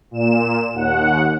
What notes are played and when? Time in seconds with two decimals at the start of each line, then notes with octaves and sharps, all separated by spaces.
0.11 A#2 E7
0.74 D#2 F#5